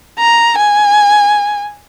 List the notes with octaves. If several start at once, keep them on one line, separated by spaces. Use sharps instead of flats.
A#5
G#5